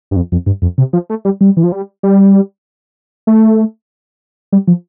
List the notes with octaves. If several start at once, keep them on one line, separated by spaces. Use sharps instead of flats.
G2
F2
F2
G2
F2
C3
F3
A3
G3
G3
E3
F3
G3
G3
A3
G3
F3